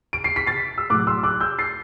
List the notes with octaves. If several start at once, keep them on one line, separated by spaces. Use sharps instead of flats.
D7
C7
B6
A6 C7
E6
A2 F#3 D6 F#6
C6 E6
D6 F#6
E6 G6
A6 C7